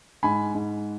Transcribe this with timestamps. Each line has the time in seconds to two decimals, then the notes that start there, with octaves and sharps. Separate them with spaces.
0.23 G#2 G#5 B5
0.55 G#2